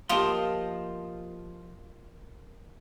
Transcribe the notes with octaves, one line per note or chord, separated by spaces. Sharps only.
F3 A#3 F4 G4 A#4 D#5 A5 C6